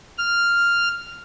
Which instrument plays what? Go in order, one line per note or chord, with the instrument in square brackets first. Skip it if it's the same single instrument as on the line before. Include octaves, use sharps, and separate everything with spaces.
[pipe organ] F6